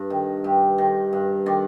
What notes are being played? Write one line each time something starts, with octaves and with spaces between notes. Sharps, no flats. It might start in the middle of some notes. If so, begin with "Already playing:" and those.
Already playing: G2
D#3
G2 G4
D#3
G2
D#3 D5